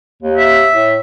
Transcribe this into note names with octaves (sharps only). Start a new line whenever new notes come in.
D#2
E5
A2